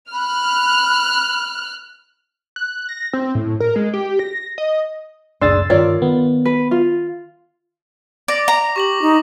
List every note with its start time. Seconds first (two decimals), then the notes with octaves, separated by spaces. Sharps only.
0.12 B5 F6 F#6
2.56 F#6
2.89 A#6
3.13 C4
3.35 A2
3.60 A#4
3.76 G#3
3.94 G4
4.19 A#6
4.58 D#5
5.41 F#1 C#2 A2 D4 G#4 C6 E6 A6
5.70 G2 D#3 F4 A#4 C#5 D5
6.02 D#3 B3
6.45 B4
6.71 F4
8.28 D5 D6 A#6
8.48 A#5
8.76 G4 C#6 A#6 F#7
9.01 D#4